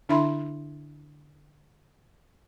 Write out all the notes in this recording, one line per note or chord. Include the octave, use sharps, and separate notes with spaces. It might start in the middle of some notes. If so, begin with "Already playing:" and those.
D3 D4 E4 E5 B5 C6